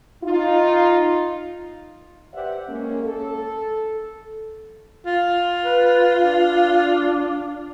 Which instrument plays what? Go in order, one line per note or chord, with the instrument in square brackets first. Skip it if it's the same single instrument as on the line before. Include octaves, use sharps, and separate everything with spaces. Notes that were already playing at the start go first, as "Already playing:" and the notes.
[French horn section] D#4 F4
[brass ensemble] G4 B4 C5 D5 E5 F#5
G#3 A#3 C#4
A4
[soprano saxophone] F4
[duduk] B4
D4